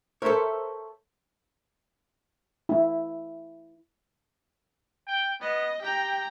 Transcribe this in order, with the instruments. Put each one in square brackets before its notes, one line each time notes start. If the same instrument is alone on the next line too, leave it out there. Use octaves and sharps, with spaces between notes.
[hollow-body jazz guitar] A4 C#5 [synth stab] A#4 C5 E5
[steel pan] E4
[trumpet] G5
[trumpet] B3 [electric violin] D#5
[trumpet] G4 [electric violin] G5 A#5